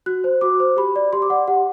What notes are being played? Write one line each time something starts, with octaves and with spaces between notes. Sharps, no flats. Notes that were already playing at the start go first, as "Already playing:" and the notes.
F#4 F#6
C5
F#4 D6
C5
G4 B5
D5
G4 C6
D6
D5 F#5
G4 F#5